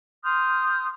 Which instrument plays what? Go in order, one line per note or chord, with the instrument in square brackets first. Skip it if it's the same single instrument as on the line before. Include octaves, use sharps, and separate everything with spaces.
[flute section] C6 D#6 F6 G6